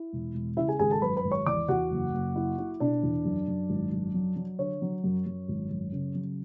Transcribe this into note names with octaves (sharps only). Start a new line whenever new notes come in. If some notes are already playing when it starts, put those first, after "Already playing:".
Already playing: E4
E1
E1
C#3 E4 E5
G#4 G#5
G#1 G#4 G#5
A4 A5
F#2 B4 B5
B4 B5
G#1
C#5 C#6
E2 D5 D6
E2 F#4 F#5
F#1
F#1
E4
E4
B2 D4 D5
E2
F#2
F#2
G#1
F#2
F#3
F#3
D3 C#5
F#3
F#2
F#2
G#1
F#2
C#3
F#3